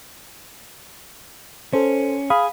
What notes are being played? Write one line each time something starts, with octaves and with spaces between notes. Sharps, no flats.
C#4 A4 C5
G#4 F5 B5 D#6